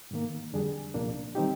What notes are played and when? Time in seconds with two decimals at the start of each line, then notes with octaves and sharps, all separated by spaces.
0.11 G#2 D#3 A#3
0.53 F2 D3 G3 D4 G#4
0.94 C2 A#2 F3 A#3 D4
1.35 D#3 G3 C4 D#4 G4